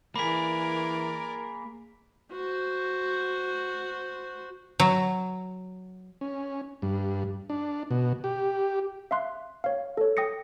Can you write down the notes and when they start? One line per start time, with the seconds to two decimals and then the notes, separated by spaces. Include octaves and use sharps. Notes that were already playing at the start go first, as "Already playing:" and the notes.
0.16 E3 A#3 G#4 A#4 D5 B5 B6
2.32 F#4 C5
4.80 F#3
6.21 C#4
6.82 G2
7.50 D4
7.91 B2
8.24 G4
9.11 E5 F5 C6 F#6
9.64 C#5 F5
9.97 A4 C#5
10.17 G5 D#6 A#6 C#7